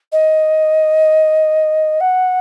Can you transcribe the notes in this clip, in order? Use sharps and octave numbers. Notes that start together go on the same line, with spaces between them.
D#5
F#5